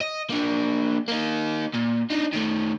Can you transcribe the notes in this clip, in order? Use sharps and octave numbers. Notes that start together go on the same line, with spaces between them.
D#5
A#3 D4
A#3 D#4
A#2
D4 D#4
D#3 A3